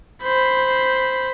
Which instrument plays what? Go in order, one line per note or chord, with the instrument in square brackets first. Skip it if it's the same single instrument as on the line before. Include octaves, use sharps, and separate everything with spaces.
[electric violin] C5 B5